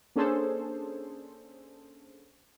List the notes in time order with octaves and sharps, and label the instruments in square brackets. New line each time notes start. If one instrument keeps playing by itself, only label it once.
[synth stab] A#3 C#4 D4 G#4 A4 C5